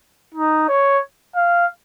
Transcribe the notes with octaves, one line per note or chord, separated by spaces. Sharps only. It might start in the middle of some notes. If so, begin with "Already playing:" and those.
D#4
C#5
F5